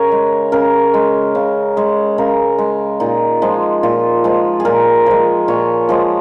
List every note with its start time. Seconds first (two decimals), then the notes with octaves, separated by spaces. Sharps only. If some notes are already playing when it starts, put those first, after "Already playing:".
Already playing: C#3 A#4 C#5
0.12 G#3
0.52 C#3 A#4
0.94 G#3
1.35 C#3
1.77 G#3
2.18 C#3 A#4
2.58 G#3
3.00 A#2 D#4
3.42 F3 G#3
3.83 A#2 F4
4.24 F3 G#3
4.60 G#4
4.65 A#2 A#4
5.06 F3 G#3
5.48 A#2 C#5
5.89 F3 G#3